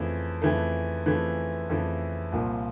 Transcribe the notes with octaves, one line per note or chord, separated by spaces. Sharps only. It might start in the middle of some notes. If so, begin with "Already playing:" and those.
Already playing: F2 C#3 E3 A3
F2 C#3 E3 A3
F2 C#3 E3 A3
F2 C#3 E3 A3
C2 A#2 F3 A#3